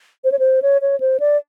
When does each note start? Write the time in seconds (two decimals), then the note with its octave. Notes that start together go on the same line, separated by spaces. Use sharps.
0.24 C5
0.32 C#5
0.39 C5
0.62 C#5
0.82 C#5
1.00 C5
1.20 D5